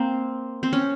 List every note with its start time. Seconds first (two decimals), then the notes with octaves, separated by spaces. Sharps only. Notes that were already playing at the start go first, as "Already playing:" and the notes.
Already playing: A#3 C4
0.63 C4
0.73 C#4